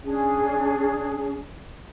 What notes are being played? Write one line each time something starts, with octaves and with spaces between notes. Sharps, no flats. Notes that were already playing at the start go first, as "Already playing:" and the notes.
C#4 D4 G#4